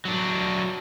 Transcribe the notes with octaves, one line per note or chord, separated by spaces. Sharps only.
F#3 D4